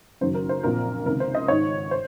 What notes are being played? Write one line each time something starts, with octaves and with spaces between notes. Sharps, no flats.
F#1 F#2 D#3 F#3 C5
A#4
C5
A#1 A#2 F3 C4 A#4
C#2 C3 D#3 A#4
C5
D#5
G#1 G#2 D#3 C#5
C5